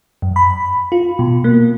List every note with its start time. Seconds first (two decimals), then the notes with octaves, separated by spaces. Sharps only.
0.22 F#2
0.36 B5
0.92 F4
1.19 B2
1.44 A#3